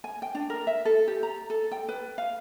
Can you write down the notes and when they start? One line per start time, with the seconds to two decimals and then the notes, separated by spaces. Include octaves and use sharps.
0.04 G#5
0.22 G5
0.35 D4
0.50 A#4
0.67 E5
0.85 A4
1.08 G4
1.23 A#5
1.50 A4
1.72 G5
1.89 B4
2.18 F5